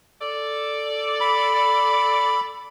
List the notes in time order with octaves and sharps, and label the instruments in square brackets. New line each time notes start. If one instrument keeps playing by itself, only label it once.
[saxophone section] A4 D5
[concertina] B5